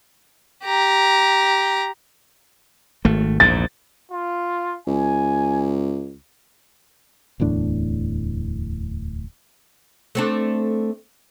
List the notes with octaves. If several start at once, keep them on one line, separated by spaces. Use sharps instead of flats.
G4 A#5
G#1 A3
A#1 E2 G#2 A6
F4
C#2 G#5
D1 E2 A2 D4
A3 C4 D4